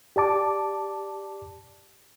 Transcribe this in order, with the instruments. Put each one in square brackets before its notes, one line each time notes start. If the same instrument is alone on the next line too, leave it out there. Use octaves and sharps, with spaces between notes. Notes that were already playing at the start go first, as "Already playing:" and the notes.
[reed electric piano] G4 D5 A5 D6